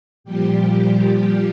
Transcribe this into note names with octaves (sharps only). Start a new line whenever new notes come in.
A#2 F3 G3 G4